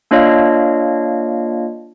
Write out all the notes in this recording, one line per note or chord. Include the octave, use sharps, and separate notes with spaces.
A#3 D4 F4 C#5 D#5 F5